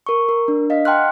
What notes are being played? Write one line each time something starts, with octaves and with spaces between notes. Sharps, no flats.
A#4 C#6
A#4
D4
D#5 F5 B6
F#5 G5 A5 C6 F6 F#6